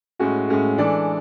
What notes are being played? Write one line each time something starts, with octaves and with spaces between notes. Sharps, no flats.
A2 G#3 C#4 F#4
A2 G#3 C#4 F#4
E3 G#3 D4 A4 D5